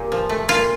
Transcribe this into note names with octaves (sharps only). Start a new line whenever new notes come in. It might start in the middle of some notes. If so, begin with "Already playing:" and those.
Already playing: A#2 G4
F3
A3
A#2 F4